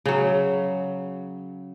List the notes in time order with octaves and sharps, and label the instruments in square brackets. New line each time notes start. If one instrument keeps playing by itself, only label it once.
[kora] C#3 F#3